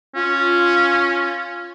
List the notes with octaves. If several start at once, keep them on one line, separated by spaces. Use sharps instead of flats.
C#4 F4